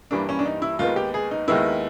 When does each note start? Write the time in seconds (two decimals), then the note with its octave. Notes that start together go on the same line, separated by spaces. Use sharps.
0.11 G2 E3 G3 A#3 D4
0.29 C#4
0.39 D4
0.46 D#4
0.62 E4
0.79 D#2 D#3 G#3 B3 F4
0.96 G4
1.14 G#4
1.31 D#4
1.48 D#2 D#3 G#3 B3 E4